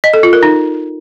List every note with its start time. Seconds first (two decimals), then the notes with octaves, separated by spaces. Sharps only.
0.04 D#5
0.14 A4
0.23 F4
0.33 A#4
0.43 D#4